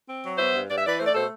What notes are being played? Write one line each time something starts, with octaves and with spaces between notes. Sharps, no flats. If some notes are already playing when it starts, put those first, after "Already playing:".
C4
F#3
B3 C5 E5
G2
G2 D5
E5
E3 B4 D5
A3 C5
D5
B2 A4 C5